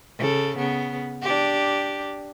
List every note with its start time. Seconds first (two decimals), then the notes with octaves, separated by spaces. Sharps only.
0.18 C#3 A4
0.57 C#3 B3
1.22 D4 G4